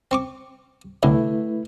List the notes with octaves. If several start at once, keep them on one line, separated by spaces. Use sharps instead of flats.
C4 C#6 D6
C2 A2 D3 A3 E4 B4